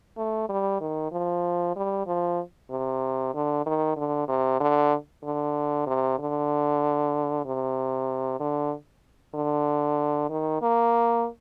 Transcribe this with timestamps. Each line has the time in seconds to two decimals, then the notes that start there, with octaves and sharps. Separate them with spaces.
0.17 A3
0.49 G3
0.81 D#3
1.12 F3
1.76 G3
2.07 F3
2.71 C3
3.34 D3
3.66 D#3
3.97 D3
4.28 C3
4.61 D3
5.24 D3
5.87 C3
6.19 D3
7.45 C3
8.40 D3
9.35 D3
10.30 D#3
10.62 A#3